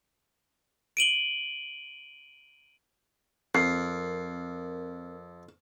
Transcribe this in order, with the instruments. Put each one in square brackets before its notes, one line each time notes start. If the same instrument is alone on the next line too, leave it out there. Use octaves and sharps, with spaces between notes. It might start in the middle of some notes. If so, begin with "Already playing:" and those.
[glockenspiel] D7 D#7 F#7 G7
[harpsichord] F2 [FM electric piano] C4 A#4 [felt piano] C7